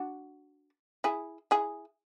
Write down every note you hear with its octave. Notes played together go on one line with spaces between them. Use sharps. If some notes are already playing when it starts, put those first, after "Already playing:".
Already playing: D4 F#4
E4 G#4
E4 G#4